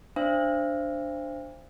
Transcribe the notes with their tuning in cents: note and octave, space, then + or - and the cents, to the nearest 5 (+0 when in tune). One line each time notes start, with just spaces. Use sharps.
D4 +5 C5 +0 F5 -45